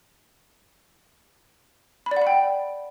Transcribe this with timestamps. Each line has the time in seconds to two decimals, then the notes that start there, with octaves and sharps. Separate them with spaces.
2.06 B5
2.11 D5
2.16 F#5
2.22 B5
2.27 G5